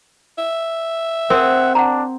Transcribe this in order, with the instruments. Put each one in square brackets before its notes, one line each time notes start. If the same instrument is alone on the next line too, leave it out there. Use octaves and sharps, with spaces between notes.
[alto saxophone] E5
[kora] C4 G#4 [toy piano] A#4 [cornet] F#5
[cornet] D4 [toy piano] F#5 A#5